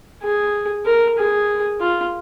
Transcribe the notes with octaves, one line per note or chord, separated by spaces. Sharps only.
G#4
A#4
G#4
F4